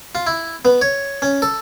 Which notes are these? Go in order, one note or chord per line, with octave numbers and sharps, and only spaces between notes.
F4
E4
B3
C#5
C#4
A4